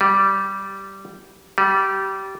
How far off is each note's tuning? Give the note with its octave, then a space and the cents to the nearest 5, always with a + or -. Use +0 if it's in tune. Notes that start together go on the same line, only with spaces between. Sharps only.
G3 -10
G3 -20